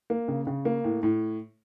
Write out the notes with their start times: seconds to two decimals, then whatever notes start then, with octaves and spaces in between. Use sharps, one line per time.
0.10 A#3
0.28 C#3
0.47 C#3
0.65 A#3
0.84 A2
1.03 A2